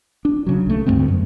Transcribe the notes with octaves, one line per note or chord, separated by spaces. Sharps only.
D4
C#3 F#3
C2 A3
D2 G2 G#3 C4
F#2